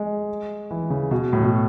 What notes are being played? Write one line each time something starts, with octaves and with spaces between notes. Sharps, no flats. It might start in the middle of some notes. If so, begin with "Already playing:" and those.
Already playing: G#3
E3
C#3
B2
A2
B2